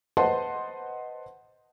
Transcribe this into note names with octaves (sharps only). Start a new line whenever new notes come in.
B4 C5 D#5 F#5 A5 C6